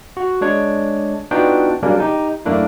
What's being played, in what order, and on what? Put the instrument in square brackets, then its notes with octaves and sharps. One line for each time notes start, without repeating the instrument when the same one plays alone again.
[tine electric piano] F#4
G#3 D4 C#5
B3 D4 D#4 F4 F#4 G5
C#3 F#3 G3 A#3 C#4 D4
D#4 G4
F#2 A3 A#3 D4 E4